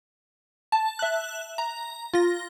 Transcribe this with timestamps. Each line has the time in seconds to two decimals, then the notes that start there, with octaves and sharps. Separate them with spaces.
0.72 A5
0.99 E5 F#6
1.58 A#5
2.14 F4 A#6